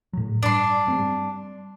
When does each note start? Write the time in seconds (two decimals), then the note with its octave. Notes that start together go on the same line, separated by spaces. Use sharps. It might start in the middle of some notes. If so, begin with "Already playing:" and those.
0.13 A2 F#3
0.43 G2 D4 C6
0.88 G3 G#3 C4